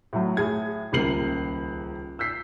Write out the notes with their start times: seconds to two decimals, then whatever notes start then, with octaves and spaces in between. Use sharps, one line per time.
0.13 A2 F#3
0.37 A2 G#4 G#6
0.92 D#1 C#2 A#3 C7 F#7
2.19 E6 G6 B6 C7